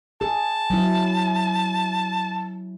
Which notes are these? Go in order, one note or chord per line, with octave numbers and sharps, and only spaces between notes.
G#4 A5
F#3 E4